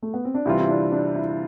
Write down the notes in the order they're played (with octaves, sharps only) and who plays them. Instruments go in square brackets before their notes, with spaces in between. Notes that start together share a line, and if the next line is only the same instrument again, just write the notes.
[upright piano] A3
B3
C4
D4
[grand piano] C3 E3 G3 C4 F4 [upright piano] E4
[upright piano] E4
D4
D4
E4